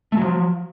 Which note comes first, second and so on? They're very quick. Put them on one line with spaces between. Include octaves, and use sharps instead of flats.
A3 F#3 F3